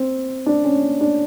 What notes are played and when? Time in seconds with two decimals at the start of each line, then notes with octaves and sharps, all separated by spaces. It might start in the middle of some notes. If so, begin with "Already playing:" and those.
Already playing: C4
0.46 D4
0.64 C#4
1.01 D4